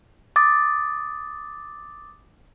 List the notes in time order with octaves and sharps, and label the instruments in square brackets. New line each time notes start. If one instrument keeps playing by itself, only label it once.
[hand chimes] D6 D#6 A6